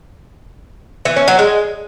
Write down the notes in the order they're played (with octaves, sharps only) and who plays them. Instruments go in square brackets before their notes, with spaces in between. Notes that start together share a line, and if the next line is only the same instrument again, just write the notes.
[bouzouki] E3
C#4
F#3
G#3